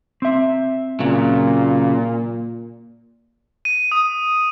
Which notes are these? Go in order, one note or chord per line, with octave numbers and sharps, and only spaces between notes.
C4 E5
A#2 C#3 F#3
D#7
D#6